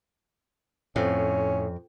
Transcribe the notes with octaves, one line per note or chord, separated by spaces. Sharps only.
F2 A2 C#4